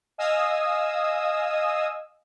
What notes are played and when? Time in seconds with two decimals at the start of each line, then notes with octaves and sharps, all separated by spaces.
0.18 D#5 F5 G#5 D#6 E6